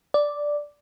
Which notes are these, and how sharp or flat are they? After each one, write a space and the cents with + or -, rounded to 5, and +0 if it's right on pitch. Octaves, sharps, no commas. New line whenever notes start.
D5 +0